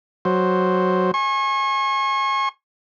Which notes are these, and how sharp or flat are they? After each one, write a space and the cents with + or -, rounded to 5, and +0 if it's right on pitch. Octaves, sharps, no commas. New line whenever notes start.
F#3 +0 C5 +0
G#5 +0 C#6 -35